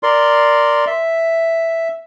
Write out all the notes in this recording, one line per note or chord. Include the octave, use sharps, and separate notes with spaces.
A#4 D5 C6
E5